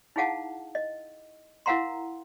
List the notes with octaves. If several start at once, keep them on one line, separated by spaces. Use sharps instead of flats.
D#4 E4 G#4 F5 F#5 A5
D#5
E4 A#4 F5 F#5 A#5 C6